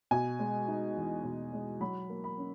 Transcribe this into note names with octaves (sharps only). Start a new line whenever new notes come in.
B2 G#5
G#3
D#4
E2
B2
G#3
F#3 B5
A#3
B5
C#4